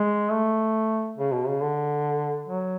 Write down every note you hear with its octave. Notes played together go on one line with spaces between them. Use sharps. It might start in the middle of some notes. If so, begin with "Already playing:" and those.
Already playing: G#3
A3
C#3
B2
C#3
D3
F#3